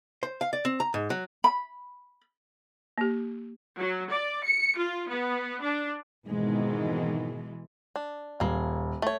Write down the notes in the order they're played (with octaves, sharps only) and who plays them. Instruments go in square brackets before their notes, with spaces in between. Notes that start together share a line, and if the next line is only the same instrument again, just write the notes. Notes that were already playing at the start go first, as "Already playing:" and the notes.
[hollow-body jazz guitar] C5
F5
D5
C4
A#5
G#2
F#3
[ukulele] B5
[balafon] A#3 G4
[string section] F#3
D5
C#7
F4
B3
D4
[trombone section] F2 G#2 D#3 [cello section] B2 E3 G#3
[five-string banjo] D4
[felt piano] D#1 [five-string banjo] A#3 G#4
[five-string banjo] A3 C#5